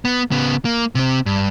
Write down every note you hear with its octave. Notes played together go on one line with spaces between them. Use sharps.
B3
C#3 B3
A#3
C3 C4
G2